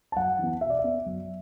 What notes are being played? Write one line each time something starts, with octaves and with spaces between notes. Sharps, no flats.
A5
F#2 F#5
E3 B3
B2 E5
D5
E5
B3
F#2